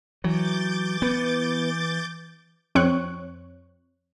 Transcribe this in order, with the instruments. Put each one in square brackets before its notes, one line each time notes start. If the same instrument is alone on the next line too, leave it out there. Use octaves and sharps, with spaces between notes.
[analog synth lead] E3 [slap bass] F#3 [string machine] D6 G6 A6
[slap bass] B3 [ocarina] B4
[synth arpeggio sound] F2 C4 C#5 C#6 F#6